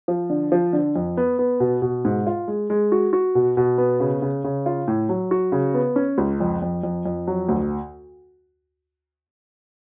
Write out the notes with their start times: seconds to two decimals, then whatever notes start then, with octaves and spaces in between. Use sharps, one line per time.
0.08 F3
0.30 D3
0.52 F3
0.73 D3
0.96 F2
1.17 B3
1.39 B3
1.60 B2
1.82 B2
2.05 G#2
2.26 F4
2.48 G#3
2.70 G#3
2.92 F#4
3.13 F#4
3.35 B2
3.57 B2
3.78 B3
4.00 C#3
4.22 C#3
4.44 C#3
4.66 F4
4.88 A2
5.09 F#3
5.31 F#4
5.52 C#3
5.74 B3
5.96 C#4
6.18 C#2
6.40 F2
6.62 F2
6.83 F2
7.05 F2
7.27 F#3
7.48 D2